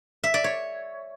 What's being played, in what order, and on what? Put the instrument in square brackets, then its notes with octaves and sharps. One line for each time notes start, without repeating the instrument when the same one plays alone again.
[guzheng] E5
D5
C#5